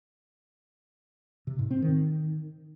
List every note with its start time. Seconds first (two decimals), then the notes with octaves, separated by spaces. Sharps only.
1.47 C3
1.59 G#2
1.71 C4
1.82 D#3